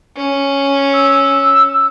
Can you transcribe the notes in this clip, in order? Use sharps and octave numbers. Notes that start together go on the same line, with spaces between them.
C#4
E6